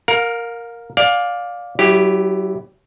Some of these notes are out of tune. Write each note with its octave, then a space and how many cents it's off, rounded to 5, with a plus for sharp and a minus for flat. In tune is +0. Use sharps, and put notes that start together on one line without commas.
A#4 +0 F5 +30
D5 -5 F5 +20 G#5 -45
F#3 +25 E4 +0 G4 +0